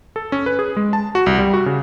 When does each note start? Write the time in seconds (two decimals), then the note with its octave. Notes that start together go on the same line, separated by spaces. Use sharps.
0.16 A4
0.32 C#4
0.46 B4
0.59 G#4
0.77 G#3
0.93 A5
1.15 F#4
1.26 C2
1.38 G3
1.54 F#4
1.66 C#3